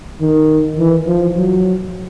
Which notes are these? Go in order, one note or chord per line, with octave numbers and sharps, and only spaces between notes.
D#3
E3
F3
F#3